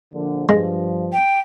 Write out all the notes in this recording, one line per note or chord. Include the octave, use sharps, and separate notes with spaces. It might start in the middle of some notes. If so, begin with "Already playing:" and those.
A#1 D3
G2 F3 G#3
G5